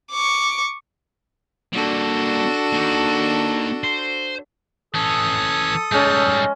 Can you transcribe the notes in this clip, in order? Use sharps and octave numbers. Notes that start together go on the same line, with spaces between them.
C#6 D6
G3 A#3 D4 F#4 A4
A#3 D#4
C5
E3 C#4 A4 D#6
G3 G#3 C#4 D#4